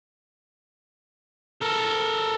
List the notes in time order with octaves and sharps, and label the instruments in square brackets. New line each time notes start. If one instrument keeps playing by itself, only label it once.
[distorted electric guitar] A4 A#4